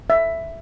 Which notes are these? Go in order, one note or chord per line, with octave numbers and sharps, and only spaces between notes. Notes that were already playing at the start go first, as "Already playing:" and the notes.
E5